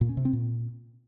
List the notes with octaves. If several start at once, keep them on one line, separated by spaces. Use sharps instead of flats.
A#2
C#4
C3
C4
A#2